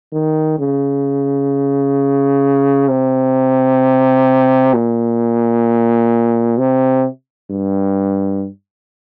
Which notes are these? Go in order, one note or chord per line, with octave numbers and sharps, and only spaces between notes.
D#3
C#3
C3
A#2
C3
G2